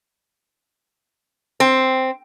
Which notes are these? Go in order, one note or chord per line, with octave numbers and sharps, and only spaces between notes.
C4